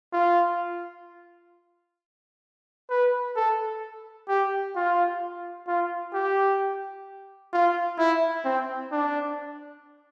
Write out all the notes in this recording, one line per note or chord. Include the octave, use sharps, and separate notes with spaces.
F4
B4
A4
G4
F4
F4
G4
F4
E4
C4
D4